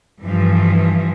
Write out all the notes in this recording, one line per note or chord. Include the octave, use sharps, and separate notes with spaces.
G2 E3 F3